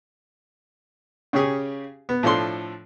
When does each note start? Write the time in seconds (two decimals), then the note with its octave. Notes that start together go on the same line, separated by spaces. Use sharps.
1.33 C#3 C#4 G4 G#4
2.09 B3
2.23 A2 F3 D4 A4 C6